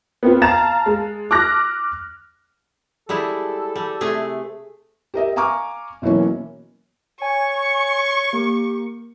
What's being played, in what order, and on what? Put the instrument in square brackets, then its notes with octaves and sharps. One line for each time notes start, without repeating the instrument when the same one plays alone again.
[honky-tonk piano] B3 C4 F4
F5 A5 A#5 A6 E7
G#3
D6 F6 F#6 A#6
[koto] G3 G#3 E4 [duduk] A4
[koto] G3
C3 A3 G#4
[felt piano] G4 A#4 D#5 E5
F5 G#5 A#5 C#6 D6 F6
B2 E3 F#3 A#3 C#4
[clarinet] C#5 [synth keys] G#5 [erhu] C#6
[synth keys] A#3 [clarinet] G4